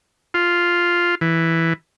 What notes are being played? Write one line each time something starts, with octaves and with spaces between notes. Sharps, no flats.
F4
E3